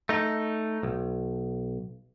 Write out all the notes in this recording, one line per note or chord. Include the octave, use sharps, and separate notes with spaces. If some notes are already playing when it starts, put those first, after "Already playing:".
A3 D#4
B1